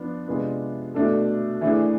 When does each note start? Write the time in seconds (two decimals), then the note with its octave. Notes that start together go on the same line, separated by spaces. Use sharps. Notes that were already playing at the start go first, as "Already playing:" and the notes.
Already playing: F3 B3 D4
0.28 C3 G#3 B3 D4 F4
0.94 B2 A3 D4 A4
1.61 E3 A3 D4 G#4